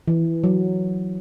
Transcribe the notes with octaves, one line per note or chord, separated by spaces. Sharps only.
E3
F#3